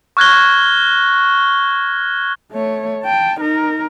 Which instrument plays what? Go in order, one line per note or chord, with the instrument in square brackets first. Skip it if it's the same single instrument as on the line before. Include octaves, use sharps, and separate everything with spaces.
[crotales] C#6 F6 F#6 G#6 A#6 G7
[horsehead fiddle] A3 C#5
G5 A5
D#4 A#4